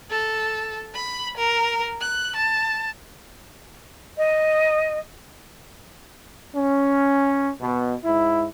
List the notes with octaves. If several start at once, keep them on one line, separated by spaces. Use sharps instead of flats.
A4
B5
A#4
F#6
A5
D#5
C#4
B2
G#2 E4